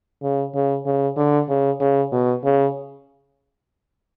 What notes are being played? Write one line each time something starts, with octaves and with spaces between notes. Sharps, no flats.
C#3
C#3
C#3
D3
C#3
C#3
B2
C#3